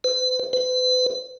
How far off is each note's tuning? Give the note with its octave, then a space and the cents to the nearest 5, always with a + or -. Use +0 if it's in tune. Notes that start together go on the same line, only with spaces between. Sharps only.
B4 +45
B4 +40